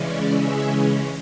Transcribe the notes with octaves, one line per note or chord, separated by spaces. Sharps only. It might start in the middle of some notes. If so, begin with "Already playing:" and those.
Already playing: C#3 E3 G#3 C#4 D5
E5